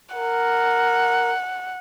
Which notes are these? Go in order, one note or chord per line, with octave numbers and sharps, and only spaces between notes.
A#4 F#5